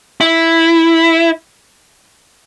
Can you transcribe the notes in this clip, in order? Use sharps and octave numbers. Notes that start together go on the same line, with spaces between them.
E4